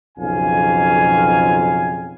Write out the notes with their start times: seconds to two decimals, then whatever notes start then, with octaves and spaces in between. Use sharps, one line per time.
0.18 B1 F2 C#3 F5 G#5